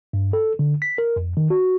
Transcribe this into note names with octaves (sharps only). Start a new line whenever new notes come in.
G2
A4
D3
B6
A#4
F2
D#3
F#4